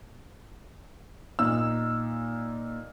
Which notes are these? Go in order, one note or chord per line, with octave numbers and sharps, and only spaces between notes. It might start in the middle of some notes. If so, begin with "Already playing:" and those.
A#2 D#4 E6